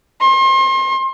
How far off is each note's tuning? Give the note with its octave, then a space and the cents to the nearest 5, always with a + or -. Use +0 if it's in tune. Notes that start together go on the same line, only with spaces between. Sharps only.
C6 +35